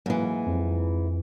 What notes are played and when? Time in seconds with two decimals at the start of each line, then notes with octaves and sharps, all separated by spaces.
0.06 G#2 E3 F#3 A#3
0.47 F2